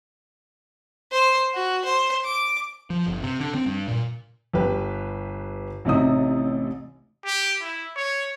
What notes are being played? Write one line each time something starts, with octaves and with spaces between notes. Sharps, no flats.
C5
F#4
C5
D6
F3
G1
C3
D3
C4
G2
A#2
G1 G4 B4
A1 C3 D#4 D#6
G4
E4
C#5